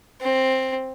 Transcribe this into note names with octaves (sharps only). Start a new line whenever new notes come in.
C4